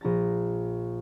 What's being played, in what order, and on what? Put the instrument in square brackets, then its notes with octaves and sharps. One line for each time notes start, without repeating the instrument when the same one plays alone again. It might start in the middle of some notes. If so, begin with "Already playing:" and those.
[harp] A#1 A#5 A6